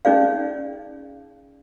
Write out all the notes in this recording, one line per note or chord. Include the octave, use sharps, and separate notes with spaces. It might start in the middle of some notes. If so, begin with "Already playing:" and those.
C#4 D#4 G#4 D5 F5